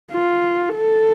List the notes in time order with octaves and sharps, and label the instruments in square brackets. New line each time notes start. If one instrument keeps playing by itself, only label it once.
[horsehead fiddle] F4
A4